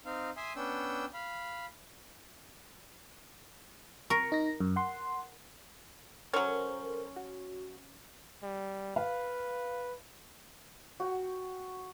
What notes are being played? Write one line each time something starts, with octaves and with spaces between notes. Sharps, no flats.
C4 D#4 F5
E5 G#5 C6 D#6
B3 C#4 D4 G5 E6
F5 B5
A#4 C#6
D#4 A#6
F#2
F#5 C6
F#3 C#4 A4 A#4 C5
F#4
G3
B4 F5
F#4 G5